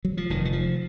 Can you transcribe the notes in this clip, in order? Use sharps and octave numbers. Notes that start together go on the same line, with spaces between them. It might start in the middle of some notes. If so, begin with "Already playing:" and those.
F#3
F3
F1 D#3
D#3
F3